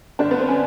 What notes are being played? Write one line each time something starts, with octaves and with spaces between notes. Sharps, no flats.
G1 D4
B3
C4
C#4